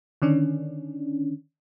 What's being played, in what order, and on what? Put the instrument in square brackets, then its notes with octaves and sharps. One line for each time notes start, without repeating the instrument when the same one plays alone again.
[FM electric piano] D3 D#3 C#4 D4